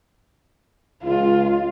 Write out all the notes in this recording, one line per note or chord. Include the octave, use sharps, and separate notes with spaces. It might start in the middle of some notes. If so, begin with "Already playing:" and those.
C#2 F4